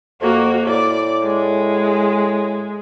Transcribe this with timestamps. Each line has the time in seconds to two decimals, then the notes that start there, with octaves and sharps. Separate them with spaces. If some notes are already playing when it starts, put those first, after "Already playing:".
0.21 F2 A#3 F#4
0.67 A2 D5
1.23 G#3